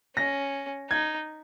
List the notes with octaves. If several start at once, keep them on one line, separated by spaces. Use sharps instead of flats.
C#4 A#6
D#4 G#6